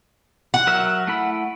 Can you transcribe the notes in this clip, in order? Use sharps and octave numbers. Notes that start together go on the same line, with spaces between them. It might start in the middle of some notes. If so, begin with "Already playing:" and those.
F#5
F#3 A#4 E5
A3 E4 B5